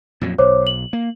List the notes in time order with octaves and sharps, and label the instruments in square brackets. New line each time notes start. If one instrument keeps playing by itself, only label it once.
[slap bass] F2 A#2 F#3
[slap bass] B1 [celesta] C5 C#5 D6
[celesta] F#7
[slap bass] A#3